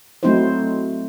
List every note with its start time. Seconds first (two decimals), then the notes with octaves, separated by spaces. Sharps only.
0.23 F#3 A3 C4 D#4 E4 C5